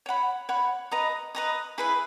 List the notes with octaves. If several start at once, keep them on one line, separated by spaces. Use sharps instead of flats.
C#5 F#5 B5
C#5 F#5 B5
B4 D#5 A#5 D#6
B4 D#5 A#5 D#6
E4 G#4 B4 E5